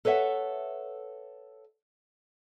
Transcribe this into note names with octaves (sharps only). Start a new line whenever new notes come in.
A4 B4 C#5 E5 F#5